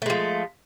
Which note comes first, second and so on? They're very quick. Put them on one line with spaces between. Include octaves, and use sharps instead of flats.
A3 G#3 F3